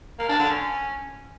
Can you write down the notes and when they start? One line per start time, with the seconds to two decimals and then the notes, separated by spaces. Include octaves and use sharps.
0.19 A#3
0.29 D4
0.39 D3
0.49 C#4